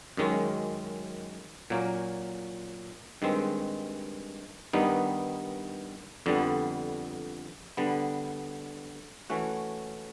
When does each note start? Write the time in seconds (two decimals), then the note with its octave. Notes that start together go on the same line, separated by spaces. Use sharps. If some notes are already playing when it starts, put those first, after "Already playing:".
0.17 F#2 D#3 G#3 C#4
1.70 A#2 F#3 A#3 C#4
3.22 G2 D#3 G#3 C4
4.73 G2 D#3 G3 B3 D#4
6.26 F2 D3 G3 B3
7.77 D3 G3 B3
9.30 E3 A3 C#4 F#4